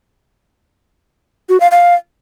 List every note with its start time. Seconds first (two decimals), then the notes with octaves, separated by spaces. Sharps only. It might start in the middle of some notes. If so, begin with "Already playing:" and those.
1.49 F#4
1.60 F5
1.71 F5